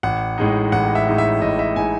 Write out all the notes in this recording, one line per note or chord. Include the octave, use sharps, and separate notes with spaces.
A1 F#5
A2 G#3 D#4
A1 F#5
E5
A2 G#3 D#4
E5
A1 D#5
E5
A2 G#3 D#4 G#5